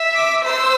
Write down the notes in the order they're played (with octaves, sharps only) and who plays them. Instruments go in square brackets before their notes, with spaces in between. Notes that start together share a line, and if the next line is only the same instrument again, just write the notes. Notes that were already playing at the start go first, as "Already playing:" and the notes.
Already playing: [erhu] E5
[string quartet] D6
[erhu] C5 [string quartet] E6